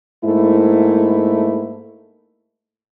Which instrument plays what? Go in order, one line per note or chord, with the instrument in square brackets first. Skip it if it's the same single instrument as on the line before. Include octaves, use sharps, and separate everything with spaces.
[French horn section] G#2 A3 A#3 E4